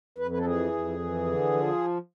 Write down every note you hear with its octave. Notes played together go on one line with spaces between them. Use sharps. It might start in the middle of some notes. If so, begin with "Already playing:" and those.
F2 B4
B4
A4
E3 G#4
F2
E3
D3
F3